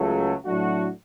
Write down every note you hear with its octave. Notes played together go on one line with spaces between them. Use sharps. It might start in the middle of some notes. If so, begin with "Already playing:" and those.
Already playing: C#2 C#3 F#3 A3
A2 F#3 A3 D4 F#4